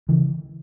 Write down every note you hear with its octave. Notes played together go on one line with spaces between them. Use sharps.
C#3 E3